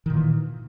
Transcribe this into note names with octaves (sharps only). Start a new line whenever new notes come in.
A#2 D#3 E3